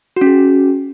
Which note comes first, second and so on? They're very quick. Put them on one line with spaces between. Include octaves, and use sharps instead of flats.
F#4 C#4 G#4